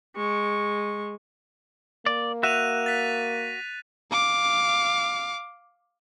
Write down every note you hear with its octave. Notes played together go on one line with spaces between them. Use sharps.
G#3 C#6
A#3 D5
F#4 E5 F#6 D#7 F7
A6 B6
F5 D6